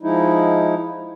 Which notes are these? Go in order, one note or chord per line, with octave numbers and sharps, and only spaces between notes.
F3 G#3 D#4 E4